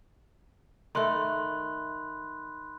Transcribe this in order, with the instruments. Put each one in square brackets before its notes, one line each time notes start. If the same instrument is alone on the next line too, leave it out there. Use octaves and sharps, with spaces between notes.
[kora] D#3 A3 [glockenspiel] B5 C6 F#6